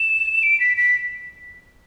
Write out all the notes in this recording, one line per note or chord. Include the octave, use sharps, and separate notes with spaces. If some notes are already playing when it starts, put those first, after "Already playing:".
Already playing: E7
D7
B6
B6